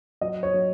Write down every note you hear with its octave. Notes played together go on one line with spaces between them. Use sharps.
F#3 D#5
C#5
F#3